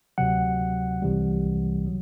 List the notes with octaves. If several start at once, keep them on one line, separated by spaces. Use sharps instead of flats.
D2 C3 F#3 F#5
C2 C3 E3 G3
F#3